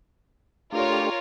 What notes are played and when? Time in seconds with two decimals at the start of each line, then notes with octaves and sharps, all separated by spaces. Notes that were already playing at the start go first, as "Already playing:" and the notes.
0.72 A3 D4 F4 G4 A#4 C#5